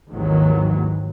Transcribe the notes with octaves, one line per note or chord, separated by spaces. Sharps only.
G#1 D#2 G#2 D#3 E3 F#3